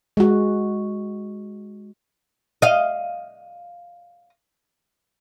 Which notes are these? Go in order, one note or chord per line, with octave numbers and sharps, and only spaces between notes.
G#3 F#4
D#5 F5